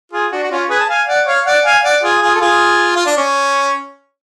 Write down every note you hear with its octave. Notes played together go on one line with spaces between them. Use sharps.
F4 G#4
D4 F#4
F#4
C#4 F4
G#4 B4
A5
F5 G#5
D5 F#5
C#5 F5
D5 F#5
F5 G#5
D5 F#5
F4 G#4
F4 G#4
A4
F4 G#4
F4
D4
C#4